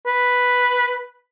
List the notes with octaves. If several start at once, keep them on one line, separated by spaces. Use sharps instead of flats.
B4